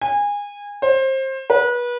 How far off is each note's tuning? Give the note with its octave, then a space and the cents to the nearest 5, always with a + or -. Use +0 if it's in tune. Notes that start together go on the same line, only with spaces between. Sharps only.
G#5 -25
C5 +25
B4 -30